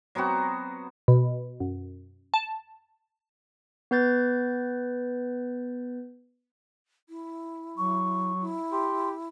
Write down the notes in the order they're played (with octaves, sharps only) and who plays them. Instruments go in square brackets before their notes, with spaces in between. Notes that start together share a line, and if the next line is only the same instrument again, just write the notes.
[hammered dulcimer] F#3 B3 C4 F#4
[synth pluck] B2
F#2
A5
[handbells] B3 B4 G6 A6
[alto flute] E4
[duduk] F#3 [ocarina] C#6
[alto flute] E4
[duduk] G4 [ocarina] C6